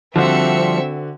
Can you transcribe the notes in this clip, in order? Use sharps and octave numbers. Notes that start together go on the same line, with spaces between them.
D3 F3 G3 C4 F#4 C5 E5 C#7